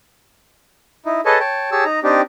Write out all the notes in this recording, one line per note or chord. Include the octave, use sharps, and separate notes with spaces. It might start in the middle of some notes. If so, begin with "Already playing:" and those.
D#4 E4
G#4 A4 B4 C#5 D#5 A5
C#5 G5 A5
G4 G#4 C#5 A5 E6
D#4 A#5
C4 D4 D#4 G4